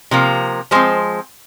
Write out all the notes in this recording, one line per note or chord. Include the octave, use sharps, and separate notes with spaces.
C3 F3 A#3
F3 G#3 C4 C5